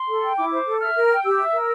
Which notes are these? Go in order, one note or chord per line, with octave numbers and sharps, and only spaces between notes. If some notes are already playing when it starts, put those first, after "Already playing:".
Already playing: C6
A4
G5
E4 D6
C5
A4
E5 F6
A#4
G5
G4 E6
E5
A#4